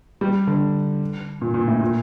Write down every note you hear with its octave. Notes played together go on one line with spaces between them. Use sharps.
G3
D3
A#2
A#2
A2
A#2